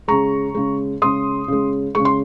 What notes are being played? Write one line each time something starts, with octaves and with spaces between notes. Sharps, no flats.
C#3 G#3 A#5 C#6
C#3 G#3
C#3 G#3 C6 D#6
C#3 G#3
C#3 G#3 C#6
C6